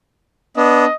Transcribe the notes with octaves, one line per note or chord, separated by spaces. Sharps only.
B3 D4 D#5